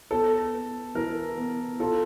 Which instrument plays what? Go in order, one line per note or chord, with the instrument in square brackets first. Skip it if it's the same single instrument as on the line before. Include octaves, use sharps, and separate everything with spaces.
[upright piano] B3 [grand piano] A4
[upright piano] B3
[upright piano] E3 [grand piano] A#4
[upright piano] B3
[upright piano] F4 [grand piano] A4